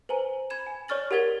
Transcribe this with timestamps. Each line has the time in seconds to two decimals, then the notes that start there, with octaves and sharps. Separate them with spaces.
0.09 B4 C5 G#5 A#5
0.50 B5 G#6 E7
0.67 G#5
0.88 C#5 D5 C#6 F6 A6 F#7
1.11 G4 A#4 F#5 G#6 A6 G7